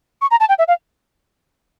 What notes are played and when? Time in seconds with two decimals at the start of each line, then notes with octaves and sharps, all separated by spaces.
0.22 C#6
0.31 A#5
0.40 A5
0.49 G5
0.59 E5
0.68 F5